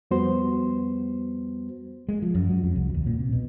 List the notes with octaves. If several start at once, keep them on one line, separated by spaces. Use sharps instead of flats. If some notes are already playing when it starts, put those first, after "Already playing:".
F2 G3 B3 F#4 C5 C6
G#3
F3
F#2
F#3
F2
C2
D#2
A#2
C3
B2